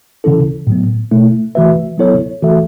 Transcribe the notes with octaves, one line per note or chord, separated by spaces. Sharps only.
C#3 E3 C#4 E4 A4
A2 F#3 B3
B2 A3 E4
E3 A3 F#4 B4 E5
F#3 B3 E4 A4 C#5
E3 A3 F#4 A4 E5